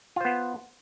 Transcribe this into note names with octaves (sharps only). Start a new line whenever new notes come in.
B3 F4 C5